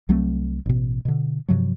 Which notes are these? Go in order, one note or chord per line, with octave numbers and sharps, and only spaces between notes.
C2 F#3 A3 C4
A1 B2
B2 D3
G2 C3 F3 F#3